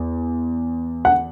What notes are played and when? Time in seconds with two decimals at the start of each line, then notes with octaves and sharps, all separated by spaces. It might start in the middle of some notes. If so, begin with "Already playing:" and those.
Already playing: E2
1.05 F#5